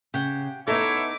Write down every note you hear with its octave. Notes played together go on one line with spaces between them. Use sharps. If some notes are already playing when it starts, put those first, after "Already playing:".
C#3 G4 F#5
B3 D#4 E4 A4 C#5 E5 D6